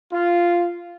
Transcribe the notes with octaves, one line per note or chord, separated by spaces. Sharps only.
F4